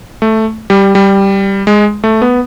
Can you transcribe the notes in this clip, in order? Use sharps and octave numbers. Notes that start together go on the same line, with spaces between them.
A3
G3
G3
G#3
A3
B3